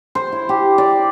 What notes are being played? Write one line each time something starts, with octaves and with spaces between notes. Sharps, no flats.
C5
E4
G4
D5